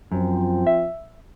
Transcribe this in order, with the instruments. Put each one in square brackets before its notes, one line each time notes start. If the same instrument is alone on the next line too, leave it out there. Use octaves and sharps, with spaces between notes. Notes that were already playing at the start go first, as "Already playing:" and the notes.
[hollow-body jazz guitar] F#2 [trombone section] F3 C4
[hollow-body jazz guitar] E5